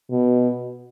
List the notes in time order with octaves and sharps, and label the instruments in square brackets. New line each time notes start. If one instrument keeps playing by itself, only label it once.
[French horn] B2